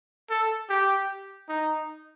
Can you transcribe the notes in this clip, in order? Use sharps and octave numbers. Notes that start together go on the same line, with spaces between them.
A4
G4
D#4